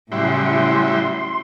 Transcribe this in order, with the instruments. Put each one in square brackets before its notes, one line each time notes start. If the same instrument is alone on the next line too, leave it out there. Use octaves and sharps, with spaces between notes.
[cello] A2 C#3 [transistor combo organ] F#3 G3 E4 [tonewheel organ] C6